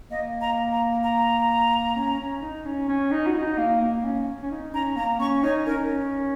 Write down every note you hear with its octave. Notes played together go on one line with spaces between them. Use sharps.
A#3 D#5
A#5
A#5
A#5
C#4
C#4
D#4
C#4
C#4
D#4
F#4
D#4
A#3
A#3
C#4
C#4
D#4
C#4 A#5
A#3 A#5
C#4 C#6
D#4 C#5
C#4 A#4